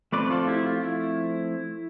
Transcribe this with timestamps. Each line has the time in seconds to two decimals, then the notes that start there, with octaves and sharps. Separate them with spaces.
0.12 F3 A3 C4 B4 D5
0.31 F4 A4
0.48 E4 G4
0.66 F4
0.84 E4